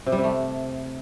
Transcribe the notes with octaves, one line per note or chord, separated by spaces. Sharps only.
C3
G3
C3
A3